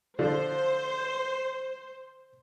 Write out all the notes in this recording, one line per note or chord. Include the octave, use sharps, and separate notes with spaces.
D3 F3 D4 C5